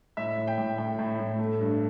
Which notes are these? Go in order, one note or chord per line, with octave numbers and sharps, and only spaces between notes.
A2 E5
A2
G5
A2
A2 G5
A2
A2
A3
G2